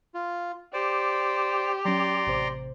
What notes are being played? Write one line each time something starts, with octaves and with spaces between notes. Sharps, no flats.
F4
G4 C5 D5 D6
F#3 C#4 D5 A#5 C6
A1 C3 C5